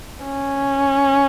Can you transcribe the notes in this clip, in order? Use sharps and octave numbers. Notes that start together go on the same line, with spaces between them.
C#4